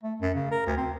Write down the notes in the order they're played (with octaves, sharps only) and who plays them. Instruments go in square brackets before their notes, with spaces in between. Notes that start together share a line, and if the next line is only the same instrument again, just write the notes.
[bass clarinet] A3
F#2
C#3
A#4
D2
C4